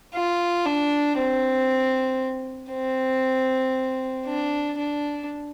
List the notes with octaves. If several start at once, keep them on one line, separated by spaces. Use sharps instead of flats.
F4
D4
C4
C4
D4
D4